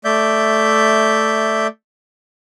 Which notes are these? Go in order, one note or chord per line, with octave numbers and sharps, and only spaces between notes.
A3 D5 E5 G6